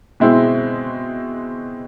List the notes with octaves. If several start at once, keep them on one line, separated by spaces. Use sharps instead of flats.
B2 G#3 C4 E4